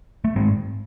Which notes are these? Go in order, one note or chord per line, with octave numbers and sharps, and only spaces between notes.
A3
G#2 G#3 C4